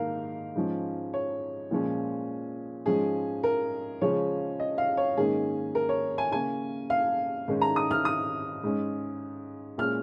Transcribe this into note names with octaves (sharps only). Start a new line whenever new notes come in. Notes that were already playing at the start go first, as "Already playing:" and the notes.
Already playing: G#2 D#3 A#3 A#4 F5
G#2 F3 C#4
C#5
A#2 F3 G#3 C#4
G#2 F3 C#4 G#4
A#4
C#3 F3 G#3 C#4 C#5
D#5
F5
C#5
G#2 D#3 A#3 C#4 G#4
A#4
C#5
G#5
C#3 A#3 C#4 G#5
F5
G#2 D#3 G#3 C#4
A#5
D#6
F6
D#6
G#2 G#3 C#4
A#2 G#3 C#4 F6